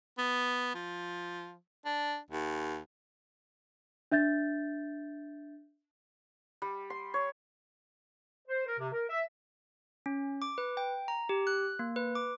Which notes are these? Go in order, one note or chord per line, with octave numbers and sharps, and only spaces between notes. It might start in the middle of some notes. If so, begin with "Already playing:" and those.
B3
F3
D4
D#2
D4 E5 G6 A6
G3
C6
C#5
C5
A#4
C3
A#4
E5
C#4
D6
B4
G5
A#5
G4
F#6
A#3
B4
D6